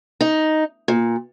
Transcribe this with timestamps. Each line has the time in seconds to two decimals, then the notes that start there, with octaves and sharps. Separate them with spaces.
0.21 D#4
0.88 A#2